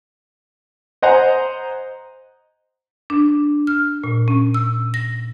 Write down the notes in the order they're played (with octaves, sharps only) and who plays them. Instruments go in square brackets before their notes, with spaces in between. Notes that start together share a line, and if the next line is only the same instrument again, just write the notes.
[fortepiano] C5 D#5 F#5 G#5 A#5
[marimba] D4
F6
A#2
C#4
E6
A#6